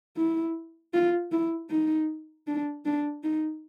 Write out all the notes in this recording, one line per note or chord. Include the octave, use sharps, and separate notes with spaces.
E4
F4
E4
D#4
D4
D4
D#4